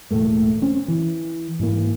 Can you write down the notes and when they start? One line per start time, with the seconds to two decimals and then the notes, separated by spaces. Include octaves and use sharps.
0.11 E1 A2 A3 A#3
0.62 C4 C#4
0.88 E3
1.59 G#2 E3 A#3